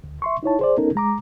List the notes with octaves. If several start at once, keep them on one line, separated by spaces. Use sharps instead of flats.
D2
E5 C6 C#6
D#4 E4 C#5 A5
G#4 C5 D5
B3 C#4 D#4 A4 A#4
G#3 A#5 D6